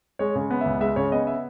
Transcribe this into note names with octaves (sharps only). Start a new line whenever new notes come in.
G#3 C#5
C#3
B3
C#2 E5
G#3 E5
C#3 C#5
B3 D#5
E5